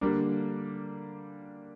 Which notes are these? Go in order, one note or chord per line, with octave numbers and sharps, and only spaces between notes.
D3 G3 A#3 D4